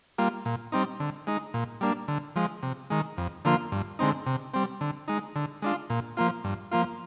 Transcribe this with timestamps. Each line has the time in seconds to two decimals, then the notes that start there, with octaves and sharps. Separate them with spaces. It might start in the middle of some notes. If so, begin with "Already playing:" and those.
0.18 G3 A#3 F4
0.45 A#2
0.72 G3 C4 D#4
1.00 D3
1.27 G#3 D#4
1.54 A#2
1.81 G3 A#3 D4
2.08 D3
2.36 F3 G#3
2.63 C3
2.90 D#3 G#3
3.18 F2
3.45 D3 F3 A#3 F4
3.72 G2
3.99 D3 G#3 C4 D#4
4.26 C3
4.54 G3 C4
4.81 D3
5.08 G#3 D#4
5.36 D3
5.62 G#3 D4 F4
5.90 A#2
6.17 F3 A#3 F4
6.44 G2
6.71 F3 A#3 F4